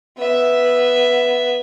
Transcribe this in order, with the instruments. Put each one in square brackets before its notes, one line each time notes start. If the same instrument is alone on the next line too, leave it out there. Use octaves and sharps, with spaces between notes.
[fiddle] B3 E5